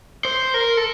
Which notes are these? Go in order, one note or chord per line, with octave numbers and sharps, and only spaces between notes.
C5
A#4
A4